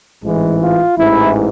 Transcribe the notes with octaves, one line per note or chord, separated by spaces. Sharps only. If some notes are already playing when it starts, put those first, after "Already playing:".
A1 G#2 E3 G#3
F4
A1 G#2 E3 E4